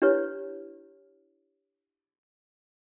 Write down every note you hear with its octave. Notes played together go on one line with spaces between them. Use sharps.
D4 E4 G4 B4 C#5